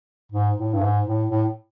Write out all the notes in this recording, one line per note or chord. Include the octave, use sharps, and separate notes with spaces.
G#2
A2
G2
G#2
A2
A2